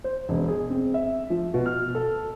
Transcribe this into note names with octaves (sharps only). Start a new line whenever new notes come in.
C5
E1
G#4
C4
E5
F3
B2
F6
A4